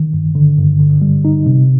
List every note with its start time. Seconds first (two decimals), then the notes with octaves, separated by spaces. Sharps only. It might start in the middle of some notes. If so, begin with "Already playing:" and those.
Already playing: D#3
0.13 G2
0.35 D3
0.58 G2
0.80 D3
1.02 G3
1.25 D#4
1.46 C3